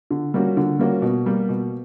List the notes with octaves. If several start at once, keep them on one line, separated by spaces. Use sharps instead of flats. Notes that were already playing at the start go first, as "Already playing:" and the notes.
D3
G3 A#3 C#4 F#4
D3
G3 A#3 C#4 F#4
B2
G3 A#3
B2